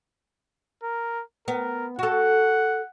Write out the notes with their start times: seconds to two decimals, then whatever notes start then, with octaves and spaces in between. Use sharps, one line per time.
0.83 A#4
1.48 B3 A#4
1.99 F#4 A4 F#5